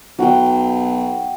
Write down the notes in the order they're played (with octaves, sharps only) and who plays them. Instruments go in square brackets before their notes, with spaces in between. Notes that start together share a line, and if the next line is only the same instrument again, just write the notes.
[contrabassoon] B1 [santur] F#4 G5